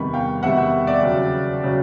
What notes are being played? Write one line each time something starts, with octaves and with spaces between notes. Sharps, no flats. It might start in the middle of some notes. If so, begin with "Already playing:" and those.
Already playing: E2 C3 D#3 G3 B5 C#6
F5 G5
E2 C3 D#3 G3 E5 F#5
E5 F#5
D5 E5
D#2 C#3 F#3
C#3 F#3